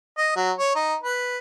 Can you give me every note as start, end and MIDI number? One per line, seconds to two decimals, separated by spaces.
0.17 0.33 75
0.36 0.51 54
0.58 0.75 73
0.75 0.94 63
1.03 1.39 71